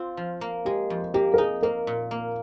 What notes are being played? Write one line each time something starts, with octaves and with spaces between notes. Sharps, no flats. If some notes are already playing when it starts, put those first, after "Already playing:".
Already playing: C4 F4
F3
A#3
G#3 G4
F2
A#3 G4
A#4
D#4 G#4
A#3 A#4
A#2
A#3